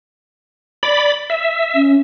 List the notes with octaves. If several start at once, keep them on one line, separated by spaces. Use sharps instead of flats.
D5 B5
E5
C#4